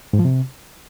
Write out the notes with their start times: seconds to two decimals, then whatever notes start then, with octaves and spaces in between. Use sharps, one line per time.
0.13 G#2
0.19 F3
0.25 C3